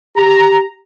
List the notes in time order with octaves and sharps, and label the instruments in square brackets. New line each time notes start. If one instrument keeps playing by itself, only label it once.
[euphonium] G4 [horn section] A#5